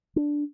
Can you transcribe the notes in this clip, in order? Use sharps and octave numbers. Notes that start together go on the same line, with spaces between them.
D4